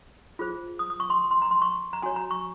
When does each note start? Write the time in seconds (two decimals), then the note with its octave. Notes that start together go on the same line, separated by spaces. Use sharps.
0.39 F4 G#4 C5
0.79 D#6
0.90 D#6
1.00 C#6
1.10 C6
1.31 C6
1.42 A#5
1.51 C6
1.62 C#6
1.93 A#5
2.02 F#4 C#5 G#5
2.16 A#5
2.31 C#6